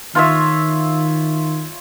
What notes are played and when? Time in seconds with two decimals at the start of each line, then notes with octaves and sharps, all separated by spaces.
0.15 D#3 F4 C#5 E5